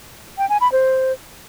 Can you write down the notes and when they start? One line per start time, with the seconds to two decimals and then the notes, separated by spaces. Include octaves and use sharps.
0.38 G5
0.49 G#5
0.61 B5
0.72 C5